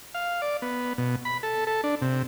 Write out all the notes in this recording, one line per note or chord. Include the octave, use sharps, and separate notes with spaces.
F5
D5
B3
B2
B5
A4
A4
D4
C3